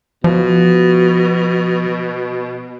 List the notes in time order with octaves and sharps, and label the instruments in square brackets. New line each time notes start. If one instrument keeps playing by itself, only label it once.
[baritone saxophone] B2 [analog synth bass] F3